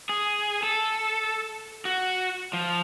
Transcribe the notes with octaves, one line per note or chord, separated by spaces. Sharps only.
G#4
A4
F#4
F3